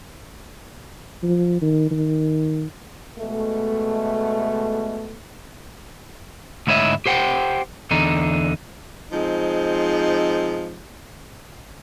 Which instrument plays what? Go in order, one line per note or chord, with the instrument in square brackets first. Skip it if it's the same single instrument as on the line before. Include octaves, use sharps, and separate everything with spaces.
[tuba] F3
D#3
D#3
[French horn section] B2 G#3 A3
[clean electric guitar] D2 G#2 E4 C#5 D#5 E5
G4 C5 F#5 G5
E2 D3 D#4
[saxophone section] F3 G#3 C4 D#4